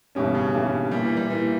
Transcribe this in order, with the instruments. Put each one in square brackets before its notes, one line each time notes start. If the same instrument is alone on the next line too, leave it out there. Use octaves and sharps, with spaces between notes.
[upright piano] G1 G2 E3 G3 C#4 [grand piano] B2
[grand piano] C#3
[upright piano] G1 G2 E3 G3 C#4
[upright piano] A#2 A#3 E4 [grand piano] G3
[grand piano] E3
G3
[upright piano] A#2 A#3 E4 [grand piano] E3